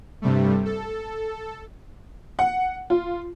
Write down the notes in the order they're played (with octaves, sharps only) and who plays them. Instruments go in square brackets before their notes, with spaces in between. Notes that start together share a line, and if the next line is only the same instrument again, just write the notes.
[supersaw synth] G2 C3 G3 A3
A4
[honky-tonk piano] F#5
F4